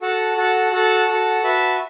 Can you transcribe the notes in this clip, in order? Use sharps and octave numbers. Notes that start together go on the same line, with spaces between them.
F#4 A4 F#5 A5
F#4 A4 F#5 A5
F#4 A4 F#5 A5
F#4 A4 F#5 A5
F#4 B4 E5 A5